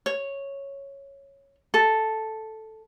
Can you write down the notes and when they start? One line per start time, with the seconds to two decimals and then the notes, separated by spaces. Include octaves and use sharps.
0.06 C#5
1.74 A4